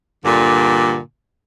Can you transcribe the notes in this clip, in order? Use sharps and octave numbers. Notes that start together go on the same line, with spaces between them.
G2 A#2 D3